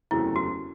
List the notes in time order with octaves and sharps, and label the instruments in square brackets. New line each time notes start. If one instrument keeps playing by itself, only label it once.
[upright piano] F#1 E2 C3 F#3 A3 [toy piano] E4
[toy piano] F#4